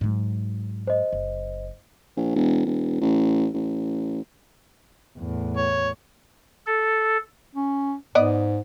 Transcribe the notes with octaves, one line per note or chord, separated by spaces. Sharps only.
G#2 F#3
C5 D#5
F#1
A#1
E1
E1
A1
A1
E2 A2
C#5
A4
C#4
G#2 B3 D5 D#5